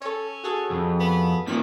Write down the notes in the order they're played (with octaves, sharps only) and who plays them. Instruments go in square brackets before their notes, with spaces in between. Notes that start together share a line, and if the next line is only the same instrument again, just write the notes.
[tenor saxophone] C#4 [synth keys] A4 C#5
[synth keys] F#4 G#4 A4
[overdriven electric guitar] F2
[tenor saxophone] B3
[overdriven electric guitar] A#2 D#3 [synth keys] B6